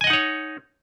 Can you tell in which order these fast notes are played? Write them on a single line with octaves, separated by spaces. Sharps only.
G#5 D#5 F#5 D#4 C#5